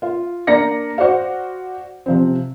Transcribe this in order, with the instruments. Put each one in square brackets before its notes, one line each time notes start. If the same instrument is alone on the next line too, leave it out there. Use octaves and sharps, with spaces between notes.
[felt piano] F4
A#3 D4 D5 A#6 C#7
F#4 C5 D5 F5
C3 F3 C4